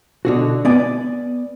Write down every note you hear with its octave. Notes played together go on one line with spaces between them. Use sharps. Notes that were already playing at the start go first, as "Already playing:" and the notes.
B2 D3 F#4
B3 D5 G#5